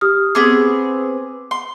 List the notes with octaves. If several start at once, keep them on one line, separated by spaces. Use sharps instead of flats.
G4 D#6 F6
B3 C4 G#4 D6
C6